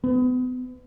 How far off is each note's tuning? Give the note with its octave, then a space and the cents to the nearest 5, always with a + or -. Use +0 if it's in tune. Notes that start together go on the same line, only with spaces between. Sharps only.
B3 +35